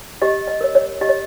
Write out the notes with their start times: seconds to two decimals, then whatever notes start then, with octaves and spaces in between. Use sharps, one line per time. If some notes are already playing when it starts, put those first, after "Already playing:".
0.22 G4 D#5
0.47 D#5
0.61 A#4 C#5
0.75 C#5
1.01 G4 D#5
1.09 C#5